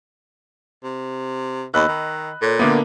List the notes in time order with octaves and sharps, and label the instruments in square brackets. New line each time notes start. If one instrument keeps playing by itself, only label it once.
[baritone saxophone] C3
[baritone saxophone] D#2 [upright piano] D#5 B5 F#6 [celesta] E6
[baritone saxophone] D#3
[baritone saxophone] A#2 [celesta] A4 C#5
[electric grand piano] D3 A#3 B3 [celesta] A#4 E5 D6